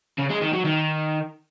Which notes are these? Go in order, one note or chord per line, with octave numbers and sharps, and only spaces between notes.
C#3
G#3
D#3
F#3
D#3